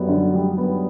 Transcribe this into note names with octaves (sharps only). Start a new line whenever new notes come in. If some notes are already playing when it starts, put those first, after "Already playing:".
Already playing: F#2 G3 B3
D3
G3
B3